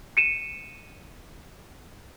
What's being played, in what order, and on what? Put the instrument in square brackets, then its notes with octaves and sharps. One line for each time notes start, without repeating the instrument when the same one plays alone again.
[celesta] C#7 D#7 E7